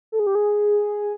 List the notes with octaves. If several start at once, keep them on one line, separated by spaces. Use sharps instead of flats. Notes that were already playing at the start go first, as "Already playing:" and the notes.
A4
G#4
G4
G#4